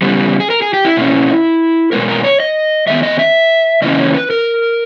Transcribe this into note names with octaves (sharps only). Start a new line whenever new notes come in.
C#3 G3 B3
G#4
A#4
G#4
G4
E4
B2 A#3 C#4
B2 G#3 B3 A#4
A#4
C#5
D#5
D#3 G#3 B3 E5
D#5
E5
C#3 E3 A#3 C#4 D#5
C#5
B4
A#4